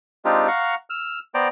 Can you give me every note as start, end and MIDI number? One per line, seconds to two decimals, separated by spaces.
0.25 0.47 56
0.25 0.47 60
0.25 0.47 62
0.25 0.47 63
0.25 0.47 65
0.25 0.47 67
0.48 0.75 77
0.48 0.75 78
0.48 0.75 82
0.48 0.75 85
0.90 1.19 88
0.90 1.19 89
1.34 1.48 59
1.34 1.48 72
1.34 1.48 74
1.34 1.48 79
1.34 1.48 82